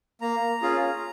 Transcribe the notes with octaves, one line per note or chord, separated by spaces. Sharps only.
A#3 A#5
C#4 F4 G#4